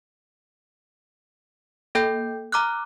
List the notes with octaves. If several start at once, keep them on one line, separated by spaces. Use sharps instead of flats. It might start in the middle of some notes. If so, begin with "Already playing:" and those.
A#3 A4 G5 G6
A#5 D6 F6 F#6